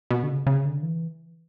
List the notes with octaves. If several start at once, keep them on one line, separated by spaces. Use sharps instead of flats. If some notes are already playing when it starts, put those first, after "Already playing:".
B2
D3
C#3
C#3
D3
E3